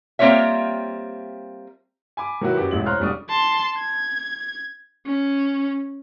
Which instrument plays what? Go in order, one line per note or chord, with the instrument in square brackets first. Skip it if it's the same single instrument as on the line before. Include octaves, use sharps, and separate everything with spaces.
[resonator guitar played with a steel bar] G3 A#3 C4 F4 C#5 E5
[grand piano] G#5 B5 D6
D#3 F#3 E4 F#4 B4
F#2 F#3 F#4 G4 D6
E1 A1 F2 G#3 E4 F#7
C5 C#5 A#5 C6 F6 F#6
E1 F2 G3 D4 C#6 D#6
[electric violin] A5 C6
G#6
C#4